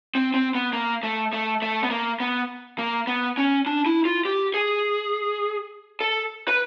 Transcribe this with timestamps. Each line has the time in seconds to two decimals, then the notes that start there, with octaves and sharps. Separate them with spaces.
0.15 C4
0.34 C4
0.55 B3
0.73 A#3
1.03 A3
1.33 A3
1.62 A3
1.84 B3
1.90 A#3
2.20 B3
2.78 A#3
3.07 B3
3.37 C#4
3.66 D4
3.86 E4
4.05 F4
4.25 G4
4.54 G#4
6.01 A4
6.48 B4